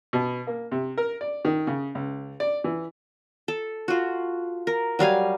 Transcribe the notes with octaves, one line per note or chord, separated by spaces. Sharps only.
B2
A#3
C3
A#4
D5
D#3
C#3
C#2
D5
E3
A4
F4 F#4
A#4
F#3 G3 F5 G#5